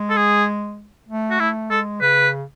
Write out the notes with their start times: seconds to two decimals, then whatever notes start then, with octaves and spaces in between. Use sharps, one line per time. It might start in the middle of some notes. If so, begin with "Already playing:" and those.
Already playing: G#3
0.10 A4
0.17 G#4
1.09 A3
1.31 F#4
1.40 A3 E4
1.70 G#3 A4
2.01 C#3 B4